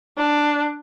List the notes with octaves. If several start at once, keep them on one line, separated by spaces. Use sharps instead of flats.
D4